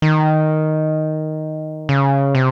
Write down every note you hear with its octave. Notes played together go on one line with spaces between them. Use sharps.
D#3
C#3
C3